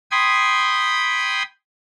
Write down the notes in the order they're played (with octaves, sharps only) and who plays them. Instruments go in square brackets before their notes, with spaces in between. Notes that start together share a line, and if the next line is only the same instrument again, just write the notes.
[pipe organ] G5 B5 C6 D#6 G#6